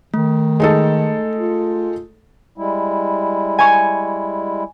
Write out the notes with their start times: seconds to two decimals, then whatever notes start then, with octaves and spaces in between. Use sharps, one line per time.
0.14 D#3 A3
0.60 G#3 D#4 A4
1.37 F4
2.58 G3 G#3 E4
3.59 G#5 C#6